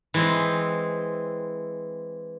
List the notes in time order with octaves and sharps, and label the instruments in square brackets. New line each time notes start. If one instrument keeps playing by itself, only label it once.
[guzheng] E3 G#3 C4